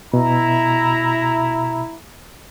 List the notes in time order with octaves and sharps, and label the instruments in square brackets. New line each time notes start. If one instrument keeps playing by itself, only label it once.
[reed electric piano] B2 [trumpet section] E4 A#5